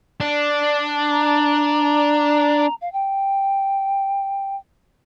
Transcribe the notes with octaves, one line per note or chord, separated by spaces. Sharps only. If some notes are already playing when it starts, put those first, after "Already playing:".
D4
A#5
F5
G5